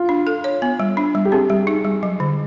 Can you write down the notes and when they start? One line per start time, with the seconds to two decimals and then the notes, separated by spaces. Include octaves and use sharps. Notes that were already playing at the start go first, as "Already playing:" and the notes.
Already playing: F4
0.09 D4
0.27 A4
0.44 C#5
0.62 B3
0.80 G3
0.97 D4
1.15 G3
1.25 G4
1.32 C4 G#4
1.50 G3
1.67 D#4
1.84 G3
2.03 F#3
2.20 D3